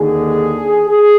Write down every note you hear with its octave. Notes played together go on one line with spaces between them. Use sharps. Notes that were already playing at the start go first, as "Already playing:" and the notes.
Already playing: D#2 D3 G#4
G#4